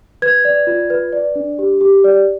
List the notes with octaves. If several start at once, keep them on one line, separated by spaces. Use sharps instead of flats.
B4 G#6
D5
F4
B4
D5
D4
G4
G4
D5